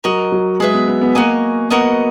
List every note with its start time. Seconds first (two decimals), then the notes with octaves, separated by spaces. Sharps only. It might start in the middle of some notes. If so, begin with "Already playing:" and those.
0.04 F#3 F#4 A#4 D#5
0.32 F#3
0.60 G#3 G#4 B4 E5
0.74 B3
0.88 B3
1.01 B3
1.15 A#3 F#4 A#4 D#5 G#5
1.70 B3 F#4 A#4 D#5 F#5